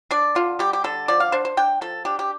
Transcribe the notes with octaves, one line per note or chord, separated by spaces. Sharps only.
D4 D5
D3 F4
G3 G4
G4
D3 A4
F3 D5
F5
D4 C5
C5
D4 G5
F3 A4
D4 G4
G4